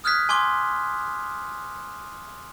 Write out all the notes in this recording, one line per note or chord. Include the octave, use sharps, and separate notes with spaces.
D#6 F6 F#6 G#6 B6
G#5 C6 D6 G#6 G7